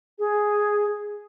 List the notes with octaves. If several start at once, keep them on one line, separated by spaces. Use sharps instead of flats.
G#4